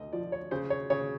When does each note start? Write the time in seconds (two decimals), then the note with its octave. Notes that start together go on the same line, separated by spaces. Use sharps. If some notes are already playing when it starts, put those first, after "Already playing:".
Already playing: D2 D#5
0.13 F3 D5
0.32 C#5
0.51 C#3 C5
0.70 C#5
0.90 C#3 C#5